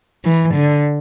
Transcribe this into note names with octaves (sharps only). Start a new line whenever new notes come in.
E3
D3